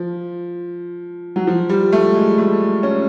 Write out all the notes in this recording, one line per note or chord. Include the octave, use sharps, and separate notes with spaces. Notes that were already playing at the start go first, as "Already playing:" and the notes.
Already playing: F3
F#3
F3
G3
A3
G#3
A3
C#4